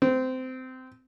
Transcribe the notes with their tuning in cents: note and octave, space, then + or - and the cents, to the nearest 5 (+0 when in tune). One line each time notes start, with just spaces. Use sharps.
C4 -20